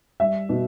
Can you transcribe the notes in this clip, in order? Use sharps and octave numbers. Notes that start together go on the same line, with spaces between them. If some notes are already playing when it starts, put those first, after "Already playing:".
G3 E5
B2